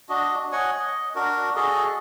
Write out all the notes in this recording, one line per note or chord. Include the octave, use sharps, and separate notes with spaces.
D4 F#4 D#5
C#5 D#5 F#5 G#5
D#5
D4 F#4 A#4
F#4 G#4 A4 D#5